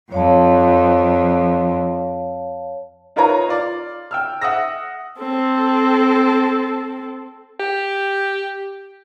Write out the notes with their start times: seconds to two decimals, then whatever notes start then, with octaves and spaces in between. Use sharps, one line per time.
0.12 F2 C#5 F5 A5
3.16 D#4 F4 A#4 B4 C#5 A#5
3.49 F4 D5
4.11 G5 E6 F6
4.41 E5 F#5 D#6 E6 A#6
5.19 C4 A4
7.60 G4